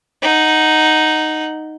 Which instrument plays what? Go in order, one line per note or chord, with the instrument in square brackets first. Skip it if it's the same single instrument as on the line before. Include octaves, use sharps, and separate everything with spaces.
[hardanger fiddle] D#4 F#5